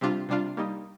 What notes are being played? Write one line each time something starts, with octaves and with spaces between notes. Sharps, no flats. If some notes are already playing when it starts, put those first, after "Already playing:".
C3 G3 D4 F4
C3 G3 D4 F4
G3 A#3 D#4